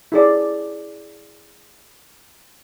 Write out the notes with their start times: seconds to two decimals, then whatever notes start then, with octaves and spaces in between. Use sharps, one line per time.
0.12 E4 G#4 D5